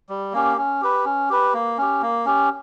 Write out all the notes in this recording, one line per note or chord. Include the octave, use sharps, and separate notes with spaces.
G3
A#3 C#4 G4
C#4
G4 B4
C#4
G4 B4
A#3
C#4 G4
A#3
C#4 G4